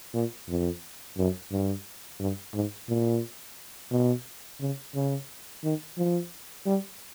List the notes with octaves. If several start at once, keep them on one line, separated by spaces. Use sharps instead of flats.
A#2
F2
F#2
G2
G2
G#2
A#2
B2
C#3
C#3
D#3
F3
G3